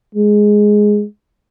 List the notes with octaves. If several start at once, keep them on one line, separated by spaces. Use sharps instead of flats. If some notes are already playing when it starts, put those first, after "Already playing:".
G#3